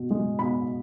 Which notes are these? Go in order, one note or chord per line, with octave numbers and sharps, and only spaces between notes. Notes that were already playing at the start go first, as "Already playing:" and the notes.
Already playing: B2
G#3
B2 B5